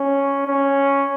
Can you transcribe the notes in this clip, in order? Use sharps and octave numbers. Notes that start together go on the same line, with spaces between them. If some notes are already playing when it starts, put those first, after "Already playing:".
Already playing: C#4
C#4